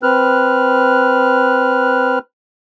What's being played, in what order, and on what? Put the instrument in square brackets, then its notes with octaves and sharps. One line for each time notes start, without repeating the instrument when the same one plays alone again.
[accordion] C4 B4 F6 F#6